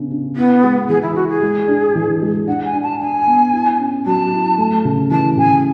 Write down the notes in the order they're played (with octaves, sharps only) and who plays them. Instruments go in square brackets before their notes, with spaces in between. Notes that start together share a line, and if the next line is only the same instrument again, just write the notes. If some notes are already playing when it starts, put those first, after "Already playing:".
Already playing: [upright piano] C#3 B3 D4
D4
[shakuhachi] B3 [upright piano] E4
[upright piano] G#3
[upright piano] E3 [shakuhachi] G#4
[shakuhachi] E4
[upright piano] E4 [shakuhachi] F#4
[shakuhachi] G#4
[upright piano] G#3
D4
E3
G#3
[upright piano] D4 [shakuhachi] F#5
[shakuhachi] G#5
[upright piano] D4
[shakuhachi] A5
[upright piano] D4 [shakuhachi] G#5
[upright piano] B3
E4
C#4
[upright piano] F#3 [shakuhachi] A5
[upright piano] E4
A3
C#3
[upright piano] E3 [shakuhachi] A5
[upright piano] C#3 [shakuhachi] G#5